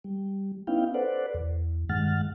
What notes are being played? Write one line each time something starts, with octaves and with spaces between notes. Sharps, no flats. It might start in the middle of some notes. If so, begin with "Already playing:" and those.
G3
B3 C#4 D#4 E4 F5 G5
A4 B4 C5 D5 F#5
E2
G2 D#3 G#3 F#5 F6 A6